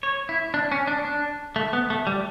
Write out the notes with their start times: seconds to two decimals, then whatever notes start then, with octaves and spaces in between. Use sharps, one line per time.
0.03 C#5
0.29 E4
0.54 D4
0.72 C#4
0.87 D4
1.05 D4
1.56 A3
1.73 B3
1.90 A3
2.07 G3